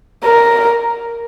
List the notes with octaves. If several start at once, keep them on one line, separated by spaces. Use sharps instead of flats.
A#4